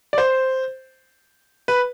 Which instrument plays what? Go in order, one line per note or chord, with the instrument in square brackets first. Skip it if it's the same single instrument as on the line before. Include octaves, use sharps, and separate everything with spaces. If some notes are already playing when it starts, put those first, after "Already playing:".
[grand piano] D5
C5
B4